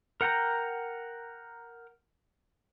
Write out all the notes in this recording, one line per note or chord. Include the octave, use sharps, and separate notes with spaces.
A#4 F#5 G5 A#5